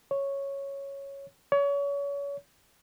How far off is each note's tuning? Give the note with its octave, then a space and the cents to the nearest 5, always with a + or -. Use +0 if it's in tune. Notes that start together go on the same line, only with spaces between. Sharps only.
C#5 -5
C#5 +30